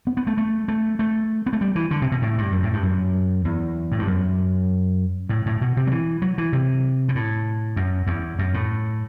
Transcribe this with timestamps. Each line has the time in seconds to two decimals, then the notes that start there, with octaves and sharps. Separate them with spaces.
0.07 B3
0.17 B3
0.27 A3
0.38 A3
0.68 A3
0.99 A3
1.46 B3
1.53 A3
1.61 G3
1.75 E3
1.91 D3
2.02 C3
2.12 B2
2.22 A2
2.38 G2
2.52 F#2
2.63 A2
2.73 G2
2.83 F#2
3.45 E2
3.92 A2
3.99 G2
4.07 F#2
5.29 A2
5.46 A2
5.61 B2
5.77 C3
5.87 F#3
5.91 E3
6.22 F#3
6.38 E3
6.53 C3
7.09 B2
7.15 A2
7.76 F#2
8.07 E2
8.39 F#2
8.54 A2